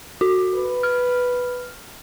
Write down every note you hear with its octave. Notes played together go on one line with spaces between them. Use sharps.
F#4
B4
F6